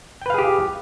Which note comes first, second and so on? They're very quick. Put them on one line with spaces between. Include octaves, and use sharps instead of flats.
G5 B4 F5 G#4 G4